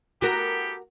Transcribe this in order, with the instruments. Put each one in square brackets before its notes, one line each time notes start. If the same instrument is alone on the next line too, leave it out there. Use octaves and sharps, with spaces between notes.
[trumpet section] B3 G4 A4 [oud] F#4 A#4